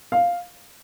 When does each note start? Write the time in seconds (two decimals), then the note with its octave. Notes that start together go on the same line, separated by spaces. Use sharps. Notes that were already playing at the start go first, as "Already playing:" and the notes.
0.12 F5